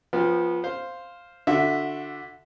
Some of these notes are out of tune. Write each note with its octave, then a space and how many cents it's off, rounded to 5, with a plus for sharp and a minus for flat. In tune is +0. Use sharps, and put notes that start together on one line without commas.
F3 +0 B3 -25 G5 +15
C5 +0 F5 +0
D3 +0 F#4 -30 E5 +0